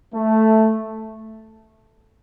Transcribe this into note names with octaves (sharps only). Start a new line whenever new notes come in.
A3